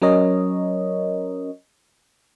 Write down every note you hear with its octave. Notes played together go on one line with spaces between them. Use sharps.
F#3 C#4 A#4 C#5 D#5